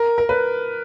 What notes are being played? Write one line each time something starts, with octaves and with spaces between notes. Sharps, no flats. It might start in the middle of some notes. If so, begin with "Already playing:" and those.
Already playing: A#4
A#4
B4